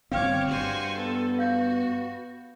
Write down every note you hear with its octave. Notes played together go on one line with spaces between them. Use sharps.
G1 C4 C#5 F5 G5 D6 F6
G2 F#4 C5 G#5
B3 A4
F#4 F5 G6